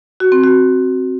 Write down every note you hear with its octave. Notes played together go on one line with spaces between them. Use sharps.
F#4
C4
F#4